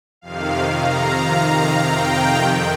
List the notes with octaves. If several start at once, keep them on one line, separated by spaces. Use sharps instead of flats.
F2 C3 D#3 F5
A#5
A#5
G5
F2 C3 D#3